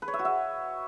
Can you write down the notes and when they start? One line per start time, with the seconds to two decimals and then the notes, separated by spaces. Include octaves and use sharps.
0.02 B4
0.08 C#5
0.14 E5
0.19 F#4
0.25 E5